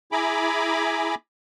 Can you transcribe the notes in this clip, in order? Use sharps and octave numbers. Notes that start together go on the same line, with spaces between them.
E4 G#4 G#5 A#5 B5 D6